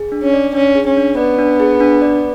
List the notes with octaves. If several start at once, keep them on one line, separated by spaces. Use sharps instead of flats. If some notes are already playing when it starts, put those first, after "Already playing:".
Already playing: G#4
D4
C#4
D5
C#4 D4
G#4
C#4
D4
B3 D5
D4
G#4
D4
D5